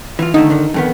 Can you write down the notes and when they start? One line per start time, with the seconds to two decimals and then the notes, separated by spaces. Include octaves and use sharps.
0.19 E3 F4
0.34 D3 D#3 A3 D#4
0.50 D3 D#3
0.74 F2 D#3 B3